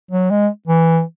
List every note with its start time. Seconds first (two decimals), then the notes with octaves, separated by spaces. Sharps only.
0.11 F#3
0.30 G#3
0.68 E3